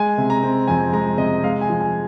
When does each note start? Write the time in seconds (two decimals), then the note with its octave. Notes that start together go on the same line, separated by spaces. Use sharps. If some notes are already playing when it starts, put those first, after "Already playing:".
Already playing: G#3 G#5
0.18 C3
0.30 A#5
0.43 C4
0.68 F2 G#5
0.92 G#3 A#5
1.18 C3 D#5
1.43 G#3 F5
1.61 G#5
1.69 F3
1.81 G#5